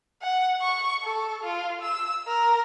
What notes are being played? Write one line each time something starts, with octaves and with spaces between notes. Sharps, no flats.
F#5
C#6
A4
F4
E6
A#4